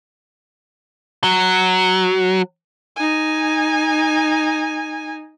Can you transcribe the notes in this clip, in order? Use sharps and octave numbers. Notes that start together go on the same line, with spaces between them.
F#3
D#4 G#5